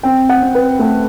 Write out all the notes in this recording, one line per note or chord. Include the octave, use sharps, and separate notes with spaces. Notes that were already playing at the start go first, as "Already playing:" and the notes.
C4 G5
F#5
C4
B4
A3 A4